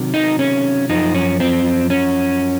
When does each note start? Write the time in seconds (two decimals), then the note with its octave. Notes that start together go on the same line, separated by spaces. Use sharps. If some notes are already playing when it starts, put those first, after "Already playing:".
Already playing: C3 D#3 F#3
0.14 D#4
0.39 C#4
0.89 F#2 F3 D#4
1.15 C#4
1.40 C4
1.90 C#4